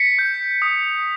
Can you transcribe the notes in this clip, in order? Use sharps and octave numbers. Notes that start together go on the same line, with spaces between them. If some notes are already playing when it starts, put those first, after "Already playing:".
Already playing: B6 C#7
G6
D#6